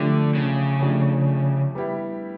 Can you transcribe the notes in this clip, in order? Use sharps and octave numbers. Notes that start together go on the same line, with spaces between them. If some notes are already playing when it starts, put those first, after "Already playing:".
Already playing: D3 F3 A3 D4 G4
C#3
F3 A3 D4 G4
G3 B3 E4 G4